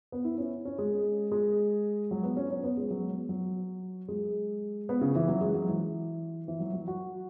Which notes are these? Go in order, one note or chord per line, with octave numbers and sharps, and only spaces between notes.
B3
E4
C#4
C#4
G#3
G#3
F#3
B3
C#4
C#4
B3
G#3
F#3
B3
F#3
G#3
B3
C#3
E3
F#3
G#3
F#3
E3
E3
F#3
F#3
F#4